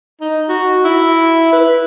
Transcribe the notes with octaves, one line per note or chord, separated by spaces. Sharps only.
D#4
F#4
E4
B4